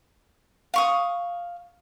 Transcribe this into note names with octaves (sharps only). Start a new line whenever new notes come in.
F5 C#6 D#6